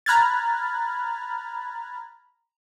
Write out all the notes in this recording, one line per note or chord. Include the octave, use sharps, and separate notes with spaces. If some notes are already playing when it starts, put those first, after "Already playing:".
A#5 B5 F6 F#6 G#6 A6